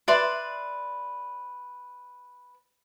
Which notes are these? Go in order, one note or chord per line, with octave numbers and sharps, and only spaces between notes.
B4 D5 E5 C6